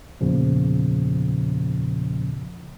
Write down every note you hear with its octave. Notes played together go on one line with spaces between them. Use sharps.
E2 A#2 C#3 F3